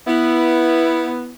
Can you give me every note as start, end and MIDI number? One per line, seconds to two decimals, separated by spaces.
0.07 1.33 59
0.07 1.33 64